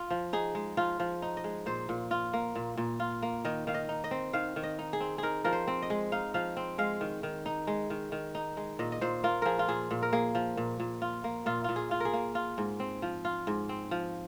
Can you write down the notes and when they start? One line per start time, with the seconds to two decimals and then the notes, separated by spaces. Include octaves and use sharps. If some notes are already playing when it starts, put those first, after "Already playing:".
Already playing: F4
0.10 F3
0.33 D#4 G#4
0.55 G#3
0.77 F3 F4
1.00 F3
1.22 D#4
1.37 D#5
1.44 G#3
1.66 A#2 C5
1.89 A#2
2.11 F4
2.33 A#3
2.55 A#2
2.77 A#2
3.00 F4
3.22 A#3
3.45 D#3 D#5
3.67 D#3 F5
3.74 D#5
3.89 D#4
4.04 D#5
4.11 C4
4.33 D#3 F5
4.56 D#3
4.63 D#5
4.79 D#4
4.93 G#4
5.00 C4
5.18 D#4 G#4 A#4
5.44 F3 A#4
5.52 C5
5.67 C4
5.82 D#5
5.90 G#3
6.12 D#4 F5
6.34 F3 F5
6.57 C4
6.78 G#3 F5
7.01 D#3
7.23 D#3
7.46 D#4
7.67 G#3
7.90 D#3
8.12 D#3
8.35 D#4
8.57 G#3
8.79 A#2 D#5
8.92 D#5
9.01 A#2 C5
9.24 A#3 F4
9.42 F3 G#4 A#4
9.59 F4
9.68 A#2 G#4
9.91 A#2
10.02 A#4
10.13 A#3 G#4
10.35 F3
10.57 A#2
10.80 A#2
11.02 F4
11.24 A#3
11.46 A#2 F4
11.64 A#2 F4
11.76 G#4
11.91 F4
12.00 G#4 A#4
12.13 A#3
12.35 F4
12.58 G#2
12.80 C4
13.02 F3
13.25 F4
13.47 G#2
13.69 C4
13.91 F3